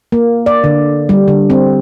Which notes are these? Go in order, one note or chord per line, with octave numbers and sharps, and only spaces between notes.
A#3
D5
D3
G3
D3
C4